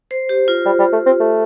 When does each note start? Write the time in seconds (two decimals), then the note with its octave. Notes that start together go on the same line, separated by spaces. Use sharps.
0.11 C5
0.29 G4
0.48 F4
0.65 G3
0.79 G3
0.93 A3
1.06 C4
1.20 A3